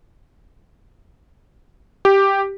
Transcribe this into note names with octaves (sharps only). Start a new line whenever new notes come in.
G4